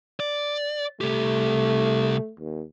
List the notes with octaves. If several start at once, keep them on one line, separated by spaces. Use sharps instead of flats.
D5
C2 A3 G4
D#2